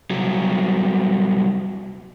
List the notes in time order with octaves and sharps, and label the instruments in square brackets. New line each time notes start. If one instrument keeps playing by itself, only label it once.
[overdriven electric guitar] C2 F#3